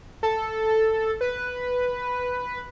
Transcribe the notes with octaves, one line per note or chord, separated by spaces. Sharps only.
A4
B4